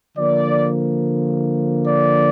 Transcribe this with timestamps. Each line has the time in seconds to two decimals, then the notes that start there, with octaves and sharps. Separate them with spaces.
0.17 D3 F3 A#3 D5
1.87 D5